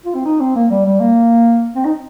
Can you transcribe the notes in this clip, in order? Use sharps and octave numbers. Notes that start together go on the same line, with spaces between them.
F4
C4
D#4
C4
A#3
G3
G3
A#3
C4
D#4